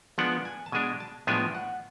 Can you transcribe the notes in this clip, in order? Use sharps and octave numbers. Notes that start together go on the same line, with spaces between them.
F3 G#3 B3 D4 F#5
G#5
A5
B2 G#3 D4 G#5
A5
A2 F3 G#3 B3 D4 G#5
F#5